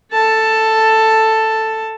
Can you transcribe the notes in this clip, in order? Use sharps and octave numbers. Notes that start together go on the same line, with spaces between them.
A4 A5